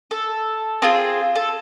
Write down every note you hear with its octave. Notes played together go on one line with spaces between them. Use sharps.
A4
C4 F4 G#4
A4